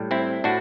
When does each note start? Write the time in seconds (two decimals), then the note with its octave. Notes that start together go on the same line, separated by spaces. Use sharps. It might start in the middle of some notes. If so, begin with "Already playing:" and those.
Already playing: A2 G3
0.11 C4 E4
0.44 A2 D4 F#4